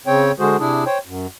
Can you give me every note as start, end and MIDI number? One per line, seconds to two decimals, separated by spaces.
0.07 0.32 49
0.07 0.32 60
0.07 0.32 73
0.07 0.32 79
0.39 0.57 50
0.39 0.57 56
0.39 0.57 66
0.39 0.57 68
0.39 0.57 72
0.59 0.84 48
0.59 0.84 62
0.59 0.84 64
0.59 0.84 68
0.86 0.98 72
0.86 0.98 73
0.86 0.98 79
1.06 1.26 42